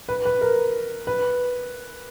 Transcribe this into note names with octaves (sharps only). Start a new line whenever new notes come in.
B4
B4
A#4
B4